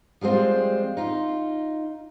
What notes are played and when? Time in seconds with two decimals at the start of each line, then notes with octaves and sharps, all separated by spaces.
0.21 F3 G3 G#3 C4 F4
0.97 D#4 F4